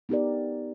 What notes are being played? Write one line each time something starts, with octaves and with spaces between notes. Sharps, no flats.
B3 D#4 G4 A#4 D5